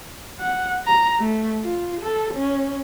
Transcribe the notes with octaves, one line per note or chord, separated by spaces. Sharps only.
F#5
A#5
A3
F4
A4
C#4